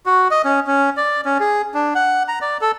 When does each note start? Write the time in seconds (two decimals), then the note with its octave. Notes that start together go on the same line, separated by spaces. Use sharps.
0.06 F#4
0.31 D#5
0.45 C#4
0.67 C#4
0.97 D5
1.25 C#4
1.40 G#4
1.74 D4
1.95 F#5
2.28 A#5
2.42 D5
2.61 A4